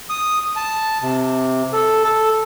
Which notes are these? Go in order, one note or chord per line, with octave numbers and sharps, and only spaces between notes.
D#6
A5
C3
A4
A4